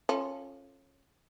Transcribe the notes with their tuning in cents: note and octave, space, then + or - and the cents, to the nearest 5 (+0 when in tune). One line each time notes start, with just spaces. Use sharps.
C#4 -20 F4 +0 A4 +0